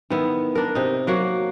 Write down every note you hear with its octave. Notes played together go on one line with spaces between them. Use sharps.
D#3 B3 E4
D4 A#4
C3 D#4
F#3 A#3 F#4